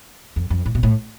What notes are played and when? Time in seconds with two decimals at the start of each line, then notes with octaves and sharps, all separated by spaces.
0.36 F2
0.50 F2
0.66 A2
0.75 B2
0.83 A2